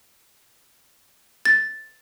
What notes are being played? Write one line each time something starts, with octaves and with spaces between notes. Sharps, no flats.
A6